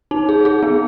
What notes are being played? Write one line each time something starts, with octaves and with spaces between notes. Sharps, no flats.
D#4
G#4
G#4
B3